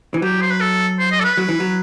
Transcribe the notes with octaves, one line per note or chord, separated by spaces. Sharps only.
E3
F#3 G4
C5
B4
A4
C5
D#5
A4
B4
F#3
E3
F#3